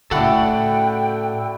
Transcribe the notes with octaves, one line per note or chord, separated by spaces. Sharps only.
A2 C#3 D4 E4 F#4 A4 F#5 G5